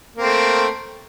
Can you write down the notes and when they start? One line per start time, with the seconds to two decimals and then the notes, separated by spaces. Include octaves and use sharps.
0.16 A#3
0.20 C4
0.23 A3